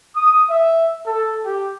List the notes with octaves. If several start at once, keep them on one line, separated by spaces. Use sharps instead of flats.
D#6
E5
A4
G4